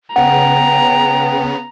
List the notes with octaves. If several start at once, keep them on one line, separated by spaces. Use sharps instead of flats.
C#3 B3 F#5 G5 A#5